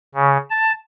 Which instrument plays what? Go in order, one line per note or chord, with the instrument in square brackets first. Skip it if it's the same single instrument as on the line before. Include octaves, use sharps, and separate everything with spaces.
[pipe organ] C#3
A5